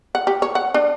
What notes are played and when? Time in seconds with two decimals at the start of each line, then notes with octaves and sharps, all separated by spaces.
0.15 F#5
0.27 G4
0.42 C#5
0.55 F#5
0.74 D4